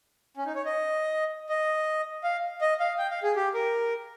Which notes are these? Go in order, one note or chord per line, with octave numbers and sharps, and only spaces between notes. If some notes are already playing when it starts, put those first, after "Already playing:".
C#4
D#4
C#5
D#5
D#5
F5
D#5
F5
G5
F5
G#4
G4
A#4